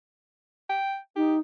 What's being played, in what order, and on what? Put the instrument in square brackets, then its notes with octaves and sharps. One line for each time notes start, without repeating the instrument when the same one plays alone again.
[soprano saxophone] G5
[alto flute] D#4 [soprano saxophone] G4